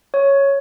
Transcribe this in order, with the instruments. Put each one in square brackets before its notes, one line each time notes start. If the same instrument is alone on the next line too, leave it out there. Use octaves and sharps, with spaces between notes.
[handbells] C#5